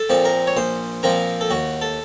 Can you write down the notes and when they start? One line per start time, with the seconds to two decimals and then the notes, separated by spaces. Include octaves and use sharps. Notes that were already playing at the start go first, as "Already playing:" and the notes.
Already playing: A4
0.09 A#2 F3 C4
0.25 A#4
0.47 C#5
0.56 A#1 C5
1.03 A#2 F3 C4 A#4
1.41 A4
1.50 D#2 F#4
1.82 A4